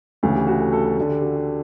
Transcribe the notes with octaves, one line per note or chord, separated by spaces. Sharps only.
D2 C#3 E3 A4
G4
F#4
A4
A4
A4
D2 D3 A4
G4
F#4
G4